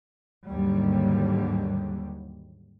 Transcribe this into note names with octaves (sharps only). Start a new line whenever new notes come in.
D#2 G#2 D3 F#3 G3